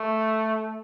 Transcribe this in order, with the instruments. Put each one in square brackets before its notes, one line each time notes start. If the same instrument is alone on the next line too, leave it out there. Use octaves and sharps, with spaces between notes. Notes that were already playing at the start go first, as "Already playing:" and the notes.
Already playing: [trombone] A3